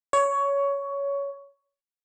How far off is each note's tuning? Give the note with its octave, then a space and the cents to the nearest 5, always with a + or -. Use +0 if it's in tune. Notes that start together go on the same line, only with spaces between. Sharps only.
C#5 +15